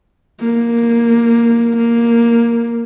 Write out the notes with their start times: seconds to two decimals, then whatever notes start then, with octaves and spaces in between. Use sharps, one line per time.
0.41 A#3
1.77 A#3